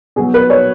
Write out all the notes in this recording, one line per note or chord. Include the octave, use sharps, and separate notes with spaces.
B2 F#3 G#4
B4
C#5